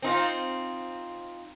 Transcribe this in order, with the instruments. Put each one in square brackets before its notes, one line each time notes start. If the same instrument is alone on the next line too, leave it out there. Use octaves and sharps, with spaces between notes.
[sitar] C4 D#4 F4